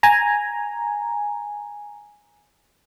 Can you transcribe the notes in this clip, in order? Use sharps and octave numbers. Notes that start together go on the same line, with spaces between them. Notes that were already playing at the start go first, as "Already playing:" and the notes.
G#5 A#5